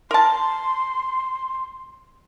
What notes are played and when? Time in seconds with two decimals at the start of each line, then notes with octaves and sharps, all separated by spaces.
0.11 A#4 A5 C6